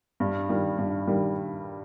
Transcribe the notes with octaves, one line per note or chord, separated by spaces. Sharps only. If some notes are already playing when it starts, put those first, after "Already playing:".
G2
D#3 G3
G2
D#3 G3